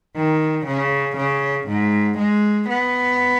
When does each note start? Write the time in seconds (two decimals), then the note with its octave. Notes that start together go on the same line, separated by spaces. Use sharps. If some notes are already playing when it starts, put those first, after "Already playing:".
0.16 D#3
0.66 C#3
1.17 C#3
1.68 G#2
2.18 G#3
2.69 B3